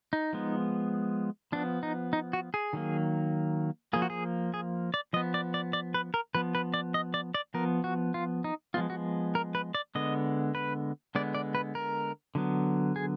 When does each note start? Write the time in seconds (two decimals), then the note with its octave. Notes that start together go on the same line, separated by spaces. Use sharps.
0.13 D#4
0.33 F3 G#3 B3
1.52 F3 B3 D4
1.83 D#4
2.13 D#4
2.33 F#4
2.54 G#4
2.73 D#3 F#3 A#3
3.93 F3 A#3 G#4
4.02 F#4
4.10 G#4
4.54 G#4
4.94 D5
5.13 F3 B3 D#5
5.34 D5
5.54 D5
5.73 D5
5.94 B4
6.14 A#4
6.35 F3 B3 B4
6.55 B4
6.74 D5
6.94 D#5
7.14 D5
7.34 D5
7.54 F3 B3 A#4
7.84 F#4
8.14 F4
8.44 D#4
8.74 F3 G#3 B3 F4
8.90 F#4
9.35 A#4
9.55 B4
9.75 D5
9.95 D3 G#3 B3 D#5
10.55 B4
11.15 D3 G#3 B3 D5
11.35 D5
11.55 B4
11.75 A#4
12.35 D3 F#3 B3
12.96 G#4